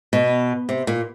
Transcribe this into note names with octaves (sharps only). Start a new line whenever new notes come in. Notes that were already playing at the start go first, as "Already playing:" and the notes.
B2
C3
A#2